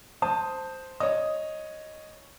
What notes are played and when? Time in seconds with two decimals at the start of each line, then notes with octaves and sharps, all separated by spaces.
0.22 C5 A5 D#6
1.00 C#5 D#5 D#6